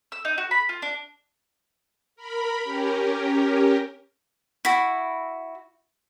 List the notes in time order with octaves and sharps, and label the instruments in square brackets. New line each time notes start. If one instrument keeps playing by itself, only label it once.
[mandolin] E6
D#4
F#4
B5
F4
D4
[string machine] A#4 B5
C#4 G4 A#4
[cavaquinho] E4 F#4